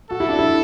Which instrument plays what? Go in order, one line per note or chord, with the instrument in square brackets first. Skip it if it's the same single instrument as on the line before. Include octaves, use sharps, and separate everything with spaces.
[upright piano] F#4 [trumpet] A4
[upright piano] E4
D4
E4